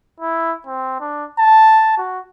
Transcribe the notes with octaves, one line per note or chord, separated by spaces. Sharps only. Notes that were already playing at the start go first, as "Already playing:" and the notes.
E4
C4
D4
A5
F#4